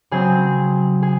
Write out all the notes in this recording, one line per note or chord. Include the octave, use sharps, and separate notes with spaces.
C#3 F#3 C4 G#4
G#4